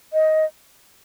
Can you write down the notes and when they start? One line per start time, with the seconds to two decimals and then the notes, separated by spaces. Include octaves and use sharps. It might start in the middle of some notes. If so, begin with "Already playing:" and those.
0.13 D#5